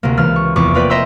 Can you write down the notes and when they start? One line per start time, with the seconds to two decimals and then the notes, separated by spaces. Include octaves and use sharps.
0.03 D2 C3 A#3
0.17 C#2 E3 F6 A6
0.36 C#6
0.56 F1 E2 C#6 D6
0.74 A#3 F4 B4 D5 G5
0.90 C5 D#5 E5 A#5 C6 E6